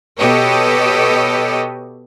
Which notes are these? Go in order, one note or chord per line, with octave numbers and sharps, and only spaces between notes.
B2 G4 A4 B4 C#5 D#5